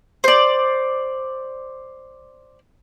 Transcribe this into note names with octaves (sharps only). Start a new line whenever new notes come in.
C5 D5